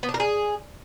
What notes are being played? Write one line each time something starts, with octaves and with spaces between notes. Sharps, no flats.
B3
D4
A#4
G#4